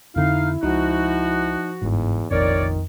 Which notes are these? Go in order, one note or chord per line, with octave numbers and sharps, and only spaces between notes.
F2 D3 C4 D#4 E4 F5
C#2 F3 D#4 F#4
G1 E2 G#2
F1 A#1 F2 A#2 D#3 A#4 C#5 D5